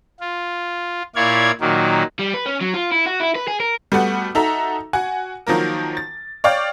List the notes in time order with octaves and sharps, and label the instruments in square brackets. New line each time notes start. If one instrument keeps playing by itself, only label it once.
[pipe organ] F4
A#2 E4 C#5 D5 F5 G#6
A#2 D#3 F#3 A#3
[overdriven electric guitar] G3
B4
C#4
F#3
F4
E4
F#4
E4
B4
G#4
A#4
[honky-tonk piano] G3 A3 B3 F#4
D#4 F#4 A4 E5 A#5
F#4 F#5 G#5
D#3 F3 F#3 A#3 A#4
A6
C#5 D5 F5 G5